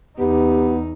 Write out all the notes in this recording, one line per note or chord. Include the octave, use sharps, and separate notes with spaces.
E2 B3 D#4 G4